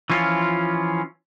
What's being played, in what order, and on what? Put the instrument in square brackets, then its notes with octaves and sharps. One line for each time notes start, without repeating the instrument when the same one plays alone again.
[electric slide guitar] E3 F3 C#4 F4